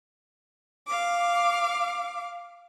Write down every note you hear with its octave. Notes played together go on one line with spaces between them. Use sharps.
F5 D6